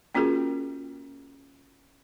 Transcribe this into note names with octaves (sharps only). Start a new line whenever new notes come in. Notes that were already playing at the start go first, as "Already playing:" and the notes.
A#3 C#4 F4 F#4 G#4 A#4